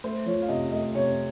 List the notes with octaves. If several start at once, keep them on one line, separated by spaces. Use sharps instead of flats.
A3 C5
F3 C#5
F5
C3 D#5
A3 D#5
C3 C#5